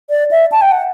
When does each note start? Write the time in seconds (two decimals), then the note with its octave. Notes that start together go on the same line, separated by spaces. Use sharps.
0.10 D5
0.31 E5
0.52 A5
0.61 G5
0.71 F#5